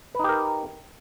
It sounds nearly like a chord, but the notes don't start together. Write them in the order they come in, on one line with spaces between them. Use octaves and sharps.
B4 D#4 G4 A#4